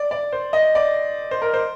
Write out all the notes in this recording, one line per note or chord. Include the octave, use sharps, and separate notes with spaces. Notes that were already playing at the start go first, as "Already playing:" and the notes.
Already playing: D5
D5
C5
D#5
D5
C5
A#4
C5